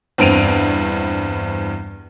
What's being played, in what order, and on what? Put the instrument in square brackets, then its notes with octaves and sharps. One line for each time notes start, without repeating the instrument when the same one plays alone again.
[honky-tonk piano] E2 G2 C4 D7 D#7 F7